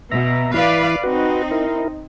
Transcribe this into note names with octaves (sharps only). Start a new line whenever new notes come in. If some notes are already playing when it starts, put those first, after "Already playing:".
B2 E5 A#5
E3 E4 B4 D5 F5
C4 D#4 F#4 B4
E4 A#4